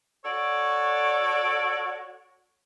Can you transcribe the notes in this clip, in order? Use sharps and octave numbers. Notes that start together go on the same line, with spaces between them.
F#4 A4 C#5 D5